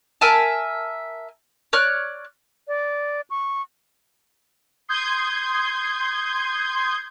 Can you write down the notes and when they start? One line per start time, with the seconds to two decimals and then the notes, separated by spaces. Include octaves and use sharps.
0.21 A#4 E5 G#5 A5
1.73 C#5 D5 F6 F#6
2.68 D5
3.30 C#6
4.88 C6 D#6 G6 G#6